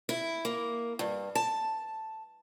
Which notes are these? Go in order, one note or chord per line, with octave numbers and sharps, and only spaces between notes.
E4
A#3
G2
A5